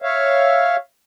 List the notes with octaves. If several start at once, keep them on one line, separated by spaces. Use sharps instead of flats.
C#5 E5 F5